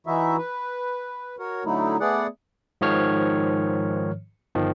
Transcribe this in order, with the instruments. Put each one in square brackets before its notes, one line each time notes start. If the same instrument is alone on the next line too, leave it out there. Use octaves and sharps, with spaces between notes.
[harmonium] E3 D#4 E4 F#4 E5
B4
F#4 A#4 C#5
D3 F#3 A3 D#4 E4
A3 B3 G#4 D5 F#5
[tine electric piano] G#2 D#3 F3 C#5 F6
G1 D#3 F3